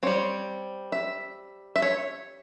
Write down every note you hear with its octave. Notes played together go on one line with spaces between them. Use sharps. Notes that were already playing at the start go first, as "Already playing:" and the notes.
G3 C4 C#5
E5
E5
C#5